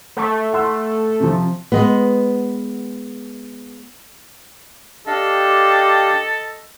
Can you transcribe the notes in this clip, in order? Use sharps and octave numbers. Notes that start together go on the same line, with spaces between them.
A3
F#5 C6 E6
C3 F3
G#3 B3
D4 G4 A4 D#5 F5